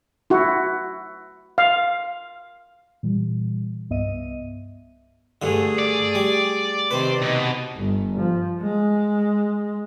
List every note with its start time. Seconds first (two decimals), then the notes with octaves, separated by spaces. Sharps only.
0.30 E4 F#4
1.58 F5
3.03 A#2 E3 G3
3.90 C2 G2 B3 D#5 E5 D#7
5.42 G2 D3 A3 G#4
5.78 D5
6.15 G3
6.91 C3 D#3 B4 C5
7.22 B2 D#4
7.76 G1
8.18 F3
8.61 G#3